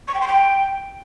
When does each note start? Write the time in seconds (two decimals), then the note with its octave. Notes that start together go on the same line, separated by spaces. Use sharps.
0.08 C#6
0.14 G5
0.21 C6
0.27 G5